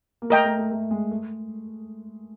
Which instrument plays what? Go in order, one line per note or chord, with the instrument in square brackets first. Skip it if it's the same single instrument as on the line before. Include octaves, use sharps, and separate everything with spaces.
[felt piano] A#3
[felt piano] A3 [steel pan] A#4 D#5 G5 A#5
[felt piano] A3
A3
A3
G#3
A3